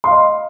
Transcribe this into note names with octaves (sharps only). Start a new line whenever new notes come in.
D#5 F5 C6